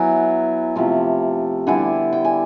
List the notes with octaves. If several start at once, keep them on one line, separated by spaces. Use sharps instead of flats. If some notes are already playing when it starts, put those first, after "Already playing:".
Already playing: F#3 B3 E4 G#5 A#5
C3 F3 A3
D3 G3 B3 E4 F#5 G#5
G5
G#5